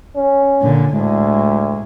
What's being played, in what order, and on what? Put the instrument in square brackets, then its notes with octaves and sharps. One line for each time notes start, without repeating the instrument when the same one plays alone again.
[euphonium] C#4
[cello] A#2 D3
[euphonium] D2 [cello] A2 G#3